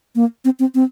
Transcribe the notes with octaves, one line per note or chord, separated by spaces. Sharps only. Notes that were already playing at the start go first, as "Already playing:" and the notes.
A#3
C4
C4
C4